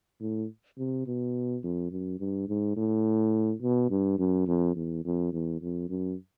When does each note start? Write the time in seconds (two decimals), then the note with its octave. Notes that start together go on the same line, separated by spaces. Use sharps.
0.21 A2
0.78 C3
1.07 B2
1.63 F2
1.91 F#2
2.20 G2
2.48 G#2
2.77 A2
3.62 B2
3.90 G2
4.19 F#2
4.47 F2
4.76 E2
5.05 F2
5.33 E2
5.61 F2
5.89 F#2